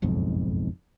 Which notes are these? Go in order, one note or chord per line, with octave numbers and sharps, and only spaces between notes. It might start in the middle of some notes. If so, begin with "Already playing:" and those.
F#1 B1 F2 G#2